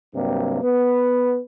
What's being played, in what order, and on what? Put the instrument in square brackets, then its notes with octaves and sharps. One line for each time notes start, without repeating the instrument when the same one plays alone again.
[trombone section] G2 C3 F#3 G3 A#3 C4
B3 B4